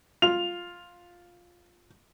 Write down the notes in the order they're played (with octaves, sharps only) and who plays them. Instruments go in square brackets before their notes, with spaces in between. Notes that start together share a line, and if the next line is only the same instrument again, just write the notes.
[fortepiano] F4 [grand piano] F7